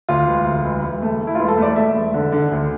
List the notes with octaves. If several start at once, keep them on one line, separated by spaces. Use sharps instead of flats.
D2 F4
E1
D2
E1
E1
A3
A3
E4
E1 F4
A4
A3 D5
A3 E5
E1
D3
D3
D2